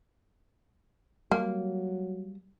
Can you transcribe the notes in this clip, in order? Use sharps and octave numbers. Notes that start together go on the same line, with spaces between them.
F#3 G3 A#3